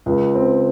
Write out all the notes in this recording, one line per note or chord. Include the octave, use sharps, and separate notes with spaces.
C#2
C4